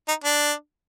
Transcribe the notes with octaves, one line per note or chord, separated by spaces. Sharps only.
D#4
D4